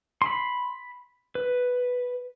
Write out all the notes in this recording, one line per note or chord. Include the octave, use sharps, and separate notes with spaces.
B5 C6
B4